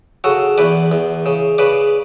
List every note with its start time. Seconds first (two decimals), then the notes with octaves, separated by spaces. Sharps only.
0.24 C#3 F#4 A4
0.58 E2 B4 D5
0.92 E2
1.26 C#3
1.58 C#3 B4 D5